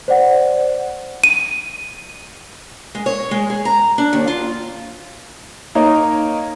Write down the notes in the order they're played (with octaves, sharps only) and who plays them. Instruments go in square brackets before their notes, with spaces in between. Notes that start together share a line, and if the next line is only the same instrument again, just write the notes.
[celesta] C5 D5 F#5
[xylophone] D#7
[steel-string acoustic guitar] G#3
C#5
G#3
G#4
A#5
D4
D#2
F4
[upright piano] A#3 D#4 A#4 C#5 D#5